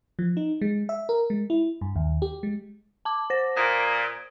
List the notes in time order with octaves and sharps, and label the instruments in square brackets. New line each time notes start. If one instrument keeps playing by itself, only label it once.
[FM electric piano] F3
D#4
G#3
E5
A#4
G#3
E4
G2
D#2
G4
G#3
[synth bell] A5 D6
C5 A#6
[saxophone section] A#2 [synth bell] D#6 G#6 D7